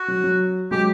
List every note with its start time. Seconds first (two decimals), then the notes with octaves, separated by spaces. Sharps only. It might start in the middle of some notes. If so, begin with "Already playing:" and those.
Already playing: F#4
0.08 F#3
0.24 F#3
0.71 F#3 G#3 G4